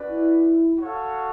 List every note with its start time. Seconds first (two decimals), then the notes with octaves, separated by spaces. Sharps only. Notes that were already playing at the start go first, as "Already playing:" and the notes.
Already playing: C#4 F#4 B4 D5
0.10 E4
0.79 F#4 A4 C#5 F5